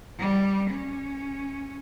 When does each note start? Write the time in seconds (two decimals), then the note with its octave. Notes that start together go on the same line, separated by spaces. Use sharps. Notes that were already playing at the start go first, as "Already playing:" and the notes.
0.19 G3
0.71 C#4